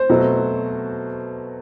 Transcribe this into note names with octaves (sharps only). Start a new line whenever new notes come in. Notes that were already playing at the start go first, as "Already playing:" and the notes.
Already playing: C5
B2 F#3 A3 C4